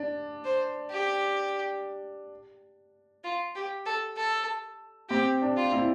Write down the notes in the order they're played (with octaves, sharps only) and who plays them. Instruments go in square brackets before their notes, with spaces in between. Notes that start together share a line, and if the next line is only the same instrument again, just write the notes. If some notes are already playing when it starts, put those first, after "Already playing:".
Already playing: [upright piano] D4
[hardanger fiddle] C5
G4
F4
G4
A4
A4
[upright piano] C4 [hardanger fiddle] G4
[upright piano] D4
[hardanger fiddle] F4
[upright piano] C4 E4